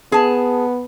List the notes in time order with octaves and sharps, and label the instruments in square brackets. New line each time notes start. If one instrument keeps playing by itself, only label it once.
[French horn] B3 [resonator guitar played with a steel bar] G#4 A5